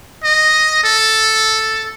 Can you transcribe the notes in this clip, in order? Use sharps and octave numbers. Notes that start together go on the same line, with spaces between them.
D#5
A4